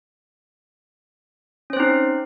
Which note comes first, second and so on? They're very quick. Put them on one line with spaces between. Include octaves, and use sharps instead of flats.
C#4 C5 C4 D#4